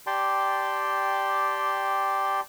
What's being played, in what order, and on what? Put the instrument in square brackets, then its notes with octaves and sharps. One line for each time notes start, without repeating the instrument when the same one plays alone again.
[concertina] G4 D5 G5 A5 C6